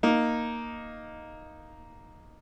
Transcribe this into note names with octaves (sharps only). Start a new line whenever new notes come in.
A#3 D#4